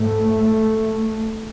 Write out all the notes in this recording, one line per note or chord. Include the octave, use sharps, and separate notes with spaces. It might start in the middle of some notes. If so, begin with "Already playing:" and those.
Already playing: G#2 A3